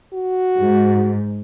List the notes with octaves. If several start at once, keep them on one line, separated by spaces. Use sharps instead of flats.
F#4
G#2